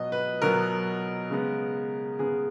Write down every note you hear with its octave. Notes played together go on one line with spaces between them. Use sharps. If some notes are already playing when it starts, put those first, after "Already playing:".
Already playing: B2 F#3 B3 D#5
B4
B2 F#3 B3 A#4
C#3 G#3 B3
C#3 G#3 B3 G#4